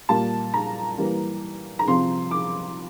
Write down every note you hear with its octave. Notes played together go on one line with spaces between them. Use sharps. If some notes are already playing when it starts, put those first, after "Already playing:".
A#2 G3 A#3 A5
A#5
E3 G3 A#3
A#5
C3 F3 C4 C6
D6